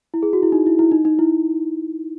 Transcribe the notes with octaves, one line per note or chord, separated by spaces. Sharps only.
E4
G#4
F#4
E4
D#4
E4
E4
D#4
D#4
E4